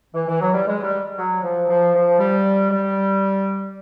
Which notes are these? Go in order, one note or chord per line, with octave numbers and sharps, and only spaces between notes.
E3
E3
F#3
G3
G#3
G3
F#3
F3
F3
F3
G3
G3